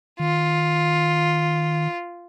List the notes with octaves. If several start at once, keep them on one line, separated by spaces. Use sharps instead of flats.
D#3 F4